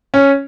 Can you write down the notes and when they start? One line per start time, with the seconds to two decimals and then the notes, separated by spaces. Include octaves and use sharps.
0.14 C#4